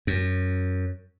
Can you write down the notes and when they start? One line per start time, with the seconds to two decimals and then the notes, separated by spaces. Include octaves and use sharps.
0.07 F#2